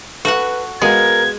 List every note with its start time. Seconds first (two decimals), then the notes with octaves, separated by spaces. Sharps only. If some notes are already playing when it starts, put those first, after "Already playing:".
0.25 F#4 A4 B4 F#5
0.82 G#3 B3 F#4 A#4 F5 G#6